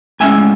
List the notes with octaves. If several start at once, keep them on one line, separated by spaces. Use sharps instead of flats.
A2 G#3 C#4 E5 G#5